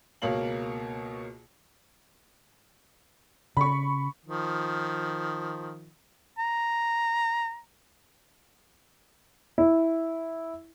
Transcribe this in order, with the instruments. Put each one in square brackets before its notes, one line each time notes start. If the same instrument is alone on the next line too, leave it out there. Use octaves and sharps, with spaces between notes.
[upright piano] C#2 B2 A#3 C#5 F5 F#7
[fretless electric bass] C#3 [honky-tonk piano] B5 C#6
[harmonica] D#3 F3
[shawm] A#5
[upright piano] E4